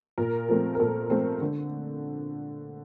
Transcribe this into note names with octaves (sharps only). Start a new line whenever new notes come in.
A#2 A#4
F3 A3 C4
A#4
A#2 A4
F3 A3 C4
D3